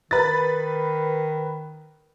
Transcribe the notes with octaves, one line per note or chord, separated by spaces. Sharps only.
D#3 B4 A6